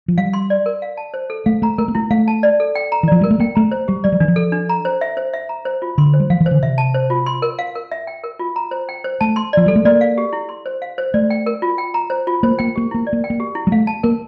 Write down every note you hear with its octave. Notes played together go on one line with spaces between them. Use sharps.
F3
G3 F5
C6
D5
A#4
F5
A5
C5
A4
A3 F5
A3 A#5
A3 A#4
A#3
A3 E4
A3 F5
A5
D5
A4
G5
A#5
E3
F3 D5
G3 A#4
A3
A#3 G5
A3 A#5
C5
G3 G4
G3 D5
F3
E3 D4
F3
A4
D4
A#5
C5
E5
C5
E5
A#5
C5
F4
D3 C6
C5
G3
F3 F5
E3
C5
D3
C3 E5
A5
C5
F4
C6
A#4
F5
A#4
E5
G5
A#4
F4
A#5
C5
G5
C5
A3 A5
C6
F3 D5
G3 A4
A3
A#3 D5
F5
G4
E4
C6
C5
F5
C5
A3 D5
G5
A#4
F4
G5
A#5
C5
F4
A#3 C5
A#3 G5
A#3 G4
A#3 E4
D5
A#3
G5
A#3
G4
E4
G3
A3 F5
A5
A#3 A#4